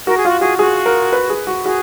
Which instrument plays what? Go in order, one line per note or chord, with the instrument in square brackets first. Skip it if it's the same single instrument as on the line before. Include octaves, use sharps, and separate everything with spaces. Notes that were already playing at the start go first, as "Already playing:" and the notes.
[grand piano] F#4 [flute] A#4
[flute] G#4
[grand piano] F4 [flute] F#4
[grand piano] F#4 [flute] G#4
[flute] F#4 [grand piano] G#4
[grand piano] A#4
B4
G#4
F#4
[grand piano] F#4 [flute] G#4